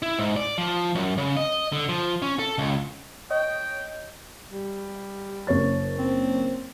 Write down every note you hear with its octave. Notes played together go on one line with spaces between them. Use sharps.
E4
G#2
D5
F3
F#2
C#3
D#5
D3
F3
C#4
A4
C#2
C#5 D#5 G5
G3
F#1 C#5 A6
C4